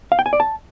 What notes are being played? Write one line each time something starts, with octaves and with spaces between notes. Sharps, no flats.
F5
G5
G#5
D5
A5